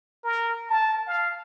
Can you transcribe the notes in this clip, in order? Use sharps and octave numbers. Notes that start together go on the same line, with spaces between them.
A#4
A5
F5